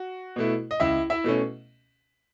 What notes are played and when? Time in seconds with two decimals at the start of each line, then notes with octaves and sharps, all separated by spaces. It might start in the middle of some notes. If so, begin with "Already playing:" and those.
Already playing: F#4
0.36 B2 A3 E4
0.71 D#5
0.80 C#2 E4 E5
1.10 E4 E5
1.24 B2 A3 C#4